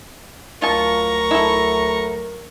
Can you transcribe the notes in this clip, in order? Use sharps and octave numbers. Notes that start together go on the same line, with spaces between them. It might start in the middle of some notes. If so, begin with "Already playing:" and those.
D2 F#3 F4 A#4 A5 A#5 C#6
E4 A4